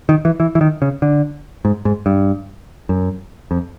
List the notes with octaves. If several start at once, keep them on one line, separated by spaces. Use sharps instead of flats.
D#3
E3
E3
E3
D#3
C#3
D3
G#2
G#2
G2
F#2
F2